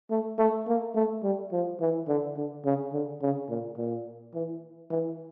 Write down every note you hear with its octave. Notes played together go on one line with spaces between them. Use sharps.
A3
A3
A#3
A3
G3
F3
E3
D3
D3
C#3
D3
C#3
A#2
A#2
E3
E3